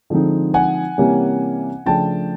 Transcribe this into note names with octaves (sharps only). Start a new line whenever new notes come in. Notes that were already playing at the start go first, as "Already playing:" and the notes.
D3 F3 G#3 C4 D#4
F#5 G#5
C3 E3 G3 A#3 C#4
C#3 F3 A3 D4 G5 A5